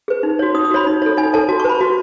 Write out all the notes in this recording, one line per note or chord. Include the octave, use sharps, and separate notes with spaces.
G#4 B4
D#4
F#4 C#5
D#4 D#6
D#6
F#4 C#5 B5
D#4
A4 C#5
D#4 G#5
A4 C#5 A5
F#4 A5
C#6
B4 B5
F#4